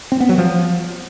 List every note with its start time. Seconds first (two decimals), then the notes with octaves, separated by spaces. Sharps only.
0.12 C4
0.20 B3
0.29 F#3
0.38 F3